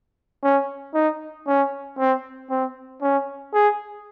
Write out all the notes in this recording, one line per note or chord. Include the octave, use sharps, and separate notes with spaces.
C#4
D#4
C#4
C4
C4
C#4
G#4